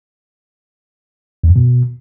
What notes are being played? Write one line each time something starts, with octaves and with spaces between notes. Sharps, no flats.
E2
F#2
B2